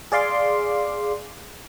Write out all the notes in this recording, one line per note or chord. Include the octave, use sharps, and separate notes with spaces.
G#4 D5 F5 C6 D6